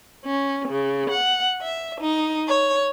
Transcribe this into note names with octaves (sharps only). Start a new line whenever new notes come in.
C#4
C#3
F#5
E5
D#4
C#5